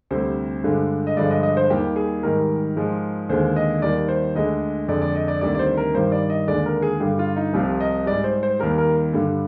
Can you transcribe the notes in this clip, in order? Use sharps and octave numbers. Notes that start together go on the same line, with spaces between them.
D2 C3 G3 C5
G2 D3 G#3
D#5
G2 D3 F3 G#3 D5
D#5
D#5
C5
D#2 D#3 G3 G4
G#4
G#2 D#3 G3 A#4
G#2 F3 G#3
D#2 D3 G#3 C5
D#5
D#2 D#3 G3 D5
C5
D2 D3 G#3 D#5
F2 D3 G#3 D5
D5
D#5
D5
D2 C3 D#3 G3 D5
D5
C5
A#4
G2 D#3 G3 C5
D5
D#5
D#2 D3 G#3 D5
A#4
G#4
G2 D3 G3 G4
F4
D#4
C2 C3 F3 F4
D#5
G#2 G3 D5
C5
C5
D#2 D#3 G3 A#4
A#4
G2 D3 G3